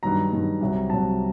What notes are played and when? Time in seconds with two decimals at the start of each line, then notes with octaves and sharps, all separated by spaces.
0.03 G2 D#3 F#3 A#5
0.32 G2 D#3 F#3
0.61 C2 C3 F#3
0.89 C2 C3 F#3 A5